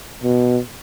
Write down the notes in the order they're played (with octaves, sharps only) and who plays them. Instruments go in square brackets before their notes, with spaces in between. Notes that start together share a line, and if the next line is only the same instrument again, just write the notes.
[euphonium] B2